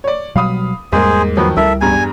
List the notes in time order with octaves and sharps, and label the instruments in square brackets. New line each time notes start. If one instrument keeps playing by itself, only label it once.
[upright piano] C#5 D5
[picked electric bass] B2 F#3 G3 [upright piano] F5 B5 D#6
[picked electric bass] E2 G3 [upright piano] G#2 A#3 [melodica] G#4 C5
[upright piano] D#3 F3 F#3 [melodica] B3
[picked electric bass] C#2 G3 [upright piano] E4 A#4 [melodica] A4 E5
[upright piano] E2 G2 A#5 [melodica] G#5